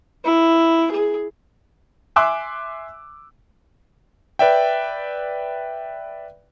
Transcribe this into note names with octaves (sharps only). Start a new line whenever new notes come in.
E4
G#4
E5 G#5 C6 D6 E6 F#6
B4 D5 E5 G5